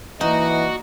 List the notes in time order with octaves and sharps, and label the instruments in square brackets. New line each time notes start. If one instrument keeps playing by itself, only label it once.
[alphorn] E3 [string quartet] A#3 D5 D#5 [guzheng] D#4 [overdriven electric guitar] F#4